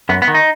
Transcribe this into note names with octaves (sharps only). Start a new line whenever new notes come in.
F#2 B3
B3
D#3
D#4